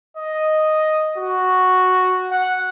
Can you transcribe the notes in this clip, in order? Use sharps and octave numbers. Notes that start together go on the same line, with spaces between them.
D#5
F#4
F#5